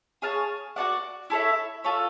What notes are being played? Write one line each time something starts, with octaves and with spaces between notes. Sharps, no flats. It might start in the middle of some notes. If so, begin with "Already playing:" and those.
G#4 C#5 F5 A5
F#4 A4 D5 F#5
E4 A4 C#5 E5
F4 A4 C#5